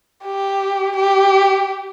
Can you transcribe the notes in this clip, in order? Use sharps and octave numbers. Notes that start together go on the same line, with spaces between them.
G4
G4